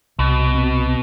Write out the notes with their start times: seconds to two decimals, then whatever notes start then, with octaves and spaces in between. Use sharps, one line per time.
0.19 C2 B2
0.55 C4